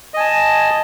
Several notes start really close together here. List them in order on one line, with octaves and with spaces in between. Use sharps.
D#5 G#5 A5